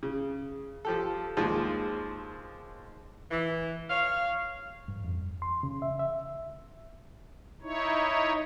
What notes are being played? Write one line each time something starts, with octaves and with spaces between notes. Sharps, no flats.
C#3
F3 G4 A4
D#2 F3 G#3
E3
C#5 F5
G2
F2
C6
C#3
E5
E5
D#4 E4 C#5